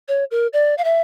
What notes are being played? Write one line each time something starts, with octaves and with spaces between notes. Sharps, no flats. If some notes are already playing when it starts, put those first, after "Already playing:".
C#5
A#4
D5
F5
E5